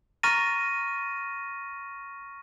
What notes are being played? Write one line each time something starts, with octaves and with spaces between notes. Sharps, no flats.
A#5 C#6 F6 A6 A#6 D#7